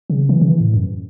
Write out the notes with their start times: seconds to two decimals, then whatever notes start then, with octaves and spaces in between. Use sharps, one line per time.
0.10 C#3
0.29 E3
0.41 C#3
0.47 E3
0.60 A2
0.74 F#2